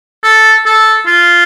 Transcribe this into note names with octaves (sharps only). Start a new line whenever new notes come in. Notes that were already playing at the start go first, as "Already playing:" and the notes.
A4
A4
F4